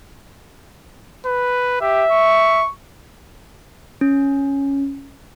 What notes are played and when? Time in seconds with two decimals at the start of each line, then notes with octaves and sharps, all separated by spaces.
1.26 B4
1.81 G4 E5
2.12 C#6
4.01 C#4